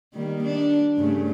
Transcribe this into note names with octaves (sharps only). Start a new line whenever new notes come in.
D#3 G3 A#3
D4
G2 C#3 A3